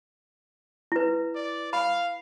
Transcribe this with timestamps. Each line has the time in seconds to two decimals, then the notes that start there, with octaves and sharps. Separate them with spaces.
0.92 E4 B4
1.35 D5
1.73 F5 B5